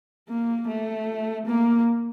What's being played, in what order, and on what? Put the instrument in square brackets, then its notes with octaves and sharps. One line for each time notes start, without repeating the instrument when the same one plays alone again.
[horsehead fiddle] A#3
A3
A#3